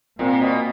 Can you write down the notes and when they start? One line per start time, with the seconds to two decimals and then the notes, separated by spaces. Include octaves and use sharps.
0.18 A#2 A#3 C4
0.41 B2